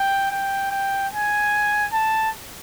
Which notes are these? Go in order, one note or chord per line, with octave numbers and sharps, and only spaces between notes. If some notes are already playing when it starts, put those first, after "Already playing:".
Already playing: G5
G5
G5
G#5
A5